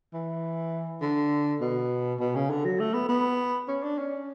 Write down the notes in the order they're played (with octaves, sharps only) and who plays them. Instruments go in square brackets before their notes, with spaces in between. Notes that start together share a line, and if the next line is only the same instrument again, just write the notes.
[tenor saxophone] E3
D3
B2
B2
C#3
D3
F#3
A3
B3
B3
C#4
D4
C#4